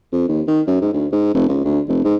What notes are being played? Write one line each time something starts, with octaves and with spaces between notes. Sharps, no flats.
F2
D#2
D#3
F#2
G#2
D2
G#2
F1
C#2
D2
F1
G#2